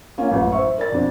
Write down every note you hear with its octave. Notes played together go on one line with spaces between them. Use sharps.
A#3 C#4 F4
A1 F#2
C5 E5 C#6
A#4 D5 A6
F2 B2 D4